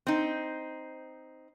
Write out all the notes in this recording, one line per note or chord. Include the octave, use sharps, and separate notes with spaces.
C4 D#4